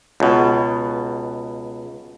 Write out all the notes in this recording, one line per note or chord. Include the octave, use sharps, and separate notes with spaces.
C#2 B2